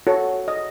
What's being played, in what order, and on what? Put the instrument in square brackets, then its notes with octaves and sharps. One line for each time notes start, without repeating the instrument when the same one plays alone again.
[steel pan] F#4 A4 C#5
D#5